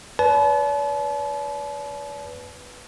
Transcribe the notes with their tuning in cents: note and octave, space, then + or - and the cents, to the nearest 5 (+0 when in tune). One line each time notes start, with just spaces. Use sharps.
B4 +5 D5 -45 A5 -35